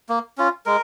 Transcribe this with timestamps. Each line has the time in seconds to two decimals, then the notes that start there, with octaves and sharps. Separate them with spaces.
0.09 A#3
0.38 C#4 F4
0.66 G#3 A#4